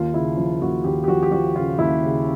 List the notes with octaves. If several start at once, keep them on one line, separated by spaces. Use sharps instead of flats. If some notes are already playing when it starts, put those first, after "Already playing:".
Already playing: D#2 F4
C#3 E4
F3
D#2 F#4
D#2 G4
G4
F3 F#4
G4
F3 F#4
C#3 F4
D#2 E4
C#3